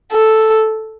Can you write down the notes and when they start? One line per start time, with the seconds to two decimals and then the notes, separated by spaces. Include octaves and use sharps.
0.12 A4